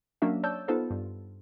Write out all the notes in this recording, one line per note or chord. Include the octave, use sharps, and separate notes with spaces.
F#3 A#3 C#4 D4 F#4 E5
C#5 D5 A5 E6 G6
B3 D#4 F4 A4 C5
G2